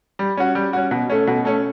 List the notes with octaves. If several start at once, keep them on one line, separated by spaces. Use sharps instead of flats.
G3
C#4 F#4
G3
C#4 F#4
B2
A3 C#4
B2
A3 C#4